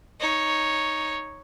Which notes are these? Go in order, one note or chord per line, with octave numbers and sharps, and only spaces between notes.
D#4 C#5